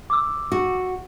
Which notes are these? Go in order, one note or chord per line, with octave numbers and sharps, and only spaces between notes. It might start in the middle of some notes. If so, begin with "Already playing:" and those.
D6 E6
F#4